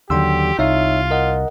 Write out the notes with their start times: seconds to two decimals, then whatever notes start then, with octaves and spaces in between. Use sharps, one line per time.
0.10 D#2 D3 F#3 G4 G5 C6 E6
0.59 C2 D#4 F4 C#5 E5
1.11 A#4 D#5 F#5